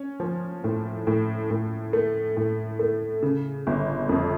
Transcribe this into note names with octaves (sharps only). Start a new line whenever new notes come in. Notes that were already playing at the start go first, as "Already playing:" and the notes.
Already playing: C#4
F3
A2
A2
A2
A3
A2
A3
C#3
G1
F2